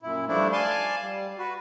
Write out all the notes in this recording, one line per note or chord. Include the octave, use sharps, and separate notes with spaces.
F#2 A#2 E4
G2 F3 A3 D4 E4
D5 F5 G#5 A5 C6
G3
F#4 B4